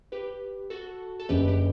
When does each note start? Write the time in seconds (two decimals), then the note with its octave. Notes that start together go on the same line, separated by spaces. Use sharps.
0.12 G4 B4
0.70 F#4 A4
1.20 A4
1.29 F#1 F#2 D3 G4 B4
1.48 G4